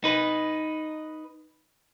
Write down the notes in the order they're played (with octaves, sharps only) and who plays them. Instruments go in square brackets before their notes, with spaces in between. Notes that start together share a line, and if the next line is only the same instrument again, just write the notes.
[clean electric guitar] D#4 B4